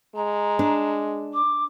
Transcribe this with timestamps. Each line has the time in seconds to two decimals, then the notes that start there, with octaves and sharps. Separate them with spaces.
0.16 G#3 A#5
0.59 D4
1.34 D6